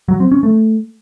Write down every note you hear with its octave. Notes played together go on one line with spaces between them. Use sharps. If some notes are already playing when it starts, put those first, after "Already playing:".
F#3
C4
C#4
A3